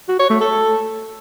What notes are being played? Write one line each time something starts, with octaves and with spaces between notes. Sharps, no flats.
F#4
C#5
A3
A4